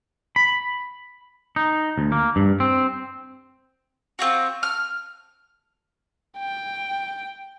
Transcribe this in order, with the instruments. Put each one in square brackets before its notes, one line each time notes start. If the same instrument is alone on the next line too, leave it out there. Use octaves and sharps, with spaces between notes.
[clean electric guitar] B5
D#4
D2
A#3
G2
C4
[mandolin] C4 F4 F#4
F6
[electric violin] G5